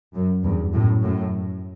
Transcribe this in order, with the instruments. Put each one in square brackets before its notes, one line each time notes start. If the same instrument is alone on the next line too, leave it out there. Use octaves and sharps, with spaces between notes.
[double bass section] F#2
E2 G2
F#2 A2
F#2 A2